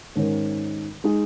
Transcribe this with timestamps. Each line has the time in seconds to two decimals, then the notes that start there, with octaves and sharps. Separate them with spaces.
0.16 G#2 D#3 C#4 A#4
1.04 G#3 D#4 G#4